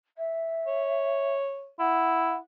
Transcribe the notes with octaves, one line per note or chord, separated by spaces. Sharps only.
E5
C#5
E4 F#5